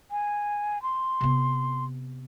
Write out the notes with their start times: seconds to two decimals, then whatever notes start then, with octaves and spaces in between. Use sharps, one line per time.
0.11 G#5
0.82 C6
1.21 C3 B3